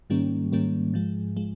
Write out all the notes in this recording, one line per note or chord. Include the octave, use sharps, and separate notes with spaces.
G#2 D#3 G3 A#3 C#4
G#2 D#3 G3 A#3 C#4
G#2 F3 G#3
F3 G#3